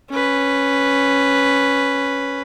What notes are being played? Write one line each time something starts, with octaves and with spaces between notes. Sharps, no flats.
C#4 B4